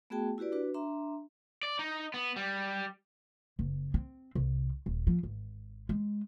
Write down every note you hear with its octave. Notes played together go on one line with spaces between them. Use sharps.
A3 B3 F#4 G#4 G5 A5
E4 F#4 G4 B4 D5
D4 F#4 B4
D4 E5 A#5 C6
D5
D#4
B3
G3
F#1
C4
C2
D#1
F3
G#1
G#3